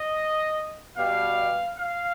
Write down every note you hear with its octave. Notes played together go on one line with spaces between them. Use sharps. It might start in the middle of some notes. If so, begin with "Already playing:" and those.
Already playing: D#5
B2 G3 F5
F5